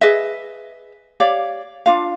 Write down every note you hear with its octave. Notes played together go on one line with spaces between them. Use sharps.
G#4 B4 D#5 E5
G4 C#5 D5 F5
D4 F4 F5